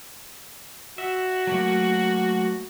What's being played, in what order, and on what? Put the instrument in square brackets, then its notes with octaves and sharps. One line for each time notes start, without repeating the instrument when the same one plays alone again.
[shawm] F#4 [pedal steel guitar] E5
[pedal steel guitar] F#3 A3 A#3